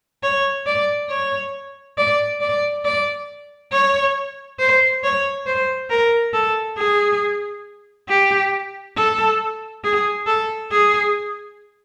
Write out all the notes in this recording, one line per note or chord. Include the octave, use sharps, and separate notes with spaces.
C#5
D5
C#5
D5
D5
D5
C#5
C5
C#5
C5
A#4
A4
G#4
G4
A4
G#4
A4
G#4